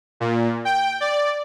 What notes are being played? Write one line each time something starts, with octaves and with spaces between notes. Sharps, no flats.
A#2
G5
D5